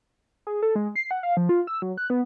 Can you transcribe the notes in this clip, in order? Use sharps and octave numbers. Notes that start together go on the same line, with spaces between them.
G#4
A4
G#3
C7
F#5
F5
F3
F4
E6
F#3
F#6
B3